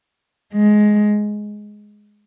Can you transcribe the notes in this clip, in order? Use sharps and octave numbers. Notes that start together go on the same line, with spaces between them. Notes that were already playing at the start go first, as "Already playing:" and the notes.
G#3